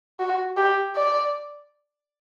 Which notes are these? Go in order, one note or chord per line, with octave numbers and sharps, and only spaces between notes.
F#4
G4
D5